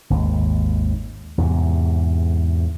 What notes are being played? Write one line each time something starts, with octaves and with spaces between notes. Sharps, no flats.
G#1 D#2
E2 G#2 C3